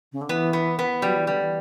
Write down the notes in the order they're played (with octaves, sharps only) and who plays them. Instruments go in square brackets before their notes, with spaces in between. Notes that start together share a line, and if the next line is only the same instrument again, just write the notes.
[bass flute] C#3
D3
[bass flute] E3 [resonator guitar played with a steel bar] B3
[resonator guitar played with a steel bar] B3
B3
[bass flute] F#3 [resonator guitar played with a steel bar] G3
[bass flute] E3
[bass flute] D3 [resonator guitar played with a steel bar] G3
[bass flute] E3